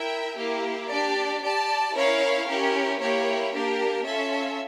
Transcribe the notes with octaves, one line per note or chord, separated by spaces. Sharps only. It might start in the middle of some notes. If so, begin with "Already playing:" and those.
Already playing: E4 A#4 E5 G5
A#3 E4 G4
D4 G4 D5
G4 D5 A5
C#4 E4 A#4 C#5 F5
C#4 E4 G4 A#4
A#3 E4 G4 C#5
A#3 D4 G4 A#4
C#4 F4 A4 E5